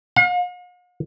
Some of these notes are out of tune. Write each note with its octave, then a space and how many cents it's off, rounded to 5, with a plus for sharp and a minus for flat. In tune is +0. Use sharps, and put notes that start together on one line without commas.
F5 +45